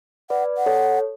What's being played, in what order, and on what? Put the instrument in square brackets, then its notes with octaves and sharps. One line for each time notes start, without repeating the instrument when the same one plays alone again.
[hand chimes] B4 D5 [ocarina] F#5
[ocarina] F#5
[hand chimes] A4 C#5